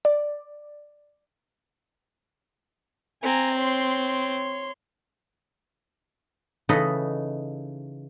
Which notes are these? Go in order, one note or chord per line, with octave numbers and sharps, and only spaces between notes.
D5
C4 G#5 A#5
C#5 C6
C#3 E3 D#4 A4 D#5 B5